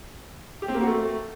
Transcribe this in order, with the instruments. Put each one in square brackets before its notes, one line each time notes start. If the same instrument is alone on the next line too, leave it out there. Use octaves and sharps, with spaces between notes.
[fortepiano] G4
C4
A#3
F#4
A3